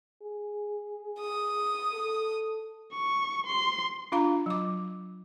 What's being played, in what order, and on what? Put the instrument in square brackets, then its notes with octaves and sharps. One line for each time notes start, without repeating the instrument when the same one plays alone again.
[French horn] G#4
[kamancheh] D#6
[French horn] A4
[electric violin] C#6
C6
[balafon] D4 F4 F5 A#5
F#3 D6